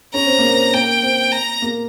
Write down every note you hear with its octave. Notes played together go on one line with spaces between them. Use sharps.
C#4 A#5
C4
A#3
C4
A#3 G5
C4
A#5
A#3